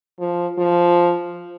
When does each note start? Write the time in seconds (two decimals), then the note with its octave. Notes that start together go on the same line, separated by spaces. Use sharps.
0.20 F3
0.58 F3